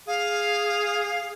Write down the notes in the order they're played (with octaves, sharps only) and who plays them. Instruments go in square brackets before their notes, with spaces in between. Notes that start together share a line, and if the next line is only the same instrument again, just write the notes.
[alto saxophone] G#4 [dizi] F5